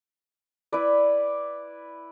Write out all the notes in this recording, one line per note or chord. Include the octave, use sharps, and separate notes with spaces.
E4 B4 D5